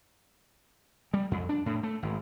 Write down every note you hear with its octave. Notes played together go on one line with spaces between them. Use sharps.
G3
F2
D4
A2
A3
G#1